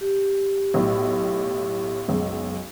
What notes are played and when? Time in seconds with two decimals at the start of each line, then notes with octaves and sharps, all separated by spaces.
0.01 G4
0.74 B1 A2
2.08 F#1 B1 G#3